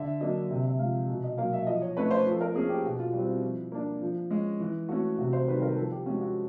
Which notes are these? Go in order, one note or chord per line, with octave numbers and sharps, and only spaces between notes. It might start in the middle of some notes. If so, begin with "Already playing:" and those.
Already playing: D3 E5
F#3 A#3 D4 D#5
C3 E5
E5
F3 G#3 F5
B2
D#5
F#3 A#3 F5
E5
F3 D#5
C#5
A3 C#4 B4
C5
F3
A4
A#4
A#3 C#4 G#4
G4
B2 F#4
F4
G3 C4 F4
E4
F3
A#3 D4
F3
G#3 C#4
E3
A3 C#4 F#4
C3 F#4
C5
D#3 G3 B4
A#4
F3 A4
G4
G#3 C#4 F#4
F#4